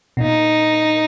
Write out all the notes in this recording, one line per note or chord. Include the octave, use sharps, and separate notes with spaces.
B2
A#2 D#4